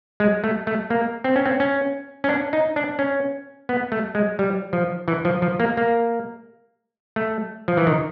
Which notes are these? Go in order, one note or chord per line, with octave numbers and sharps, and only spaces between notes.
G#3
A3
A3
A#3
C4
C#4
C4
C#4
C#4
D4
D#4
D4
C#4
B3
A3
G#3
G3
F3
E3
F3
F3
A#3
A#3
A3
F3
E3
D#3